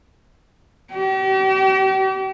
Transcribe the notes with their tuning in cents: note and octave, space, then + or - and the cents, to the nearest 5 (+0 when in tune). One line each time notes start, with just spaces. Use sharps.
G4 -40